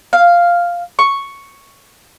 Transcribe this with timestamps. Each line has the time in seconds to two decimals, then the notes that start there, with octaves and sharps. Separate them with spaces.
0.13 F5
0.99 C#6